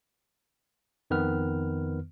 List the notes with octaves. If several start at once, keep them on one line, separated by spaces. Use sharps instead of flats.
F2 D#3 B3 B4 F6